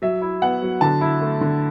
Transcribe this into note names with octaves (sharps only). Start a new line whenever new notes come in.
F#3 E5
E4
B3 F#5
F#3
D3 A5
E4
A3
D3